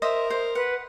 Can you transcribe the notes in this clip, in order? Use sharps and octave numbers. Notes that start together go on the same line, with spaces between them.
A#4 C5 D#5 E5
C5
B4 F#5